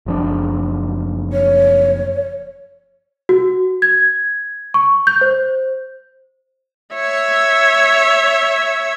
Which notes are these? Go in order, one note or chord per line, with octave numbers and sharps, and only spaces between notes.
F#1 F3 D4
C#5
F#4
G#6
C#6
G6
C5
C#5 E5